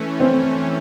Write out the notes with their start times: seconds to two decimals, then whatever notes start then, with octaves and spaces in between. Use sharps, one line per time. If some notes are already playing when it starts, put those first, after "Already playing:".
Already playing: E3 A3 C#4
0.20 C4